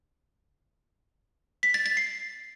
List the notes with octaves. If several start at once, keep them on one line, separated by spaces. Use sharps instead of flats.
B6
A6
A6
C7